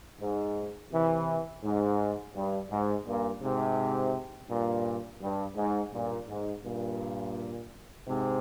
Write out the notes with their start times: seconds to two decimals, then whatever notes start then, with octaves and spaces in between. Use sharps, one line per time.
0.21 G#2
0.92 C3 E3
1.64 G#2
2.35 G2
2.70 G#2
3.06 G2 A#2
3.42 G#2 C3
4.49 G2 A#2
5.21 G2
5.56 G#2
5.93 G2 A#2
6.28 G#2
6.63 G2 A#2
8.06 G#2 C3